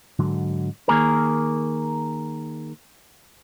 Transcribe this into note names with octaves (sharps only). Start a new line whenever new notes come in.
G#2 D3 F#3
D#3 A#3 G#4 A#4